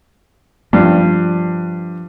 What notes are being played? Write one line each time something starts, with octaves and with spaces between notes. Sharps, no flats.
G2 F3